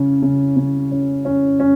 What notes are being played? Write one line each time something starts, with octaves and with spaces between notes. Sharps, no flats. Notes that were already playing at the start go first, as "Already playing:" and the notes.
Already playing: C#3 C#4
C#3
C#3
C#4
C#4
C#4